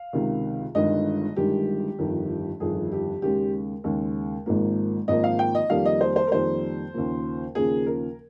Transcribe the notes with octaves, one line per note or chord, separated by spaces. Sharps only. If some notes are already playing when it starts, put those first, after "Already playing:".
Already playing: F5
C#2 C3 D#3
G1 G2 D#3 G#3 D#5
G1 G2 D#3 G#3 G4
G1 F2 D#3
G1 F2 D#3 G#4
G4
D#2 C#3 G#3 G4
D#2 C#3 G#3
G#1 G#2 F3 A#3
G#1 G#2 F3 A#3 D#5
F5
G5
D#5
F2 D#3 G3 A#3 F5
D#5
C5
C5
A#4
F2 D#3 G3 A#3 C5
D#2 C#3 F3 A#3
D#2 C#3 F3 A#3 G#4
A#4